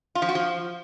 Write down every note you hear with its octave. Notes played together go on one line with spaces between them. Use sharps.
F4
F3
F#4
F3